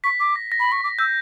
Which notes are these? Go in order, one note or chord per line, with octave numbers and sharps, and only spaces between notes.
C#6 B6
D6
A#6
A#6
B5
C#6
D6
E6 G6